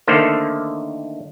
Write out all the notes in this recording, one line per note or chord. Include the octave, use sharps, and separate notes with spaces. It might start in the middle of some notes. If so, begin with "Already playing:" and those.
D3 D#3 A3 A#3 C5